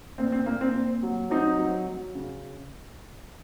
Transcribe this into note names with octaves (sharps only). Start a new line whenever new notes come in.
A#2 C4
C4
A#2 A#3
C4
A#2
F#3
F#3 C4 D#4
F#3
F#3
C#3